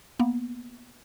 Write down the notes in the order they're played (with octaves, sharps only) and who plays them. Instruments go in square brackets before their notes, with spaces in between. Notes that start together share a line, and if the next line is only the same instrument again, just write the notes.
[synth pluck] A#3 B3